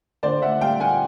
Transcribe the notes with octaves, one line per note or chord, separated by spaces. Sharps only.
D3 C5 D5
E5 F#5
G3 F5 G5
F#5 G#5